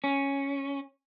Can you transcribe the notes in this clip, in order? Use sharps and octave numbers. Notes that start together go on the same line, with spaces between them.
C#4